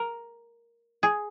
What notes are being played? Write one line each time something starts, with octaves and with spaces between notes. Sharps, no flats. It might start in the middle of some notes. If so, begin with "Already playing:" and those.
Already playing: A#4
G#4